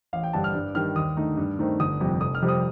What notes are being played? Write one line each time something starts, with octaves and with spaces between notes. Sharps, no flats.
A1 F5
G5
G2 D3 G3 A5
F6
G2
D#3 G3 D4 F6
D#2 D#6
D3 A3 D#4
G2
D#3 A3 C4 D#4
G1 D#6
F2 C3 G3
F1 D#6
F6
F2 C3 G3 C4
D#6